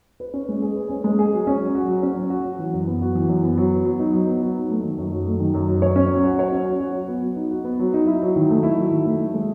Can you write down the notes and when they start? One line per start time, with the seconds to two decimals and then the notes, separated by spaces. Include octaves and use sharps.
0.20 B4
0.34 C#4
0.49 G#3
0.62 G#4
0.76 B4
0.90 C#4
1.04 G#3
1.19 G#4
1.33 F#3
1.47 C#4
1.60 F#3
1.75 F#4
1.88 F#3
2.03 C#4
2.16 F#3
2.30 F#4
2.45 F#4
2.59 E3
2.73 F#2
2.88 B3
3.02 F#4
3.15 E3
3.29 F#2
3.43 B3
3.58 F#3
3.72 B3
3.85 F#3
3.99 D#4
4.13 F#3
4.28 B3
4.42 F#3
4.55 D#4
4.70 A3
4.83 D#3
4.98 F#2
5.11 F#3
5.27 A3
5.39 D#3
5.54 F#2
5.68 F#3
5.82 C#5
5.96 C#4
6.11 F#3
6.24 F#4
6.39 C#5
6.52 C#4
6.66 F#3
6.80 F#4
6.95 F#4
7.08 B3
7.22 F#3
7.36 D#4
7.51 F#4
7.64 B3
7.79 F#3
7.94 D#4
8.07 E4
8.22 F#3
8.36 D#3
8.50 A3
8.63 E4
8.77 F#3
8.91 D#3
9.06 A3
9.20 E4
9.34 G#3